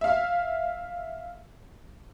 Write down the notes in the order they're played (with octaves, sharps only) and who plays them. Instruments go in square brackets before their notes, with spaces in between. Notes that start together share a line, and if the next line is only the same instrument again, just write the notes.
[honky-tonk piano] E5 F5